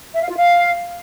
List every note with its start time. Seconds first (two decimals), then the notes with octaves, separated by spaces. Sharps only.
0.16 E5
0.23 F5
0.30 F4
0.37 F5